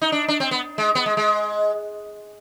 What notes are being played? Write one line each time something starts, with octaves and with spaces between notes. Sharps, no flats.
D#4
D4
D4
C4
B3
G#3
B3
G#3
G#3